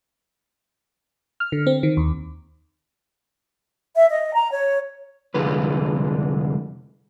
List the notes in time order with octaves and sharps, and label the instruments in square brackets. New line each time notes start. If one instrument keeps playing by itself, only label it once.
[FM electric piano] F6
D3
C4
D#3
D#2
[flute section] E5
D#5
A#5
C#5
[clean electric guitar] C2 F2 D3 G#3 B4